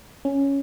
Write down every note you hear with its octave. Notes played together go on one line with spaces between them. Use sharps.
C#4